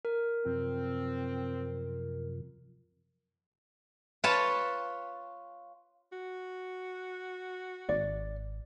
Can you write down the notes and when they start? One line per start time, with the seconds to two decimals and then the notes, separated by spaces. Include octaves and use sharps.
0.05 A#4
0.46 F#2 C3 F3 C4
4.24 F4 B4 C#5 A5
6.12 F#4
7.89 G#1 D5